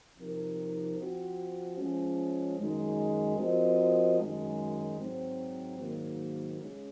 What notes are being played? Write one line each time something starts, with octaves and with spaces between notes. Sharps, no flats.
C3 F3 C4 D#4 A#4
F3 C4 F#4
F3 G#3 C#4
F#2 D#3 G#3 D#4
F3 C4 F#4 A#4 D#5
F#2 D#3 G#3
G#2 F#3 C4
G#2 D#3 F#3 A#3
C#3 G#3 C#4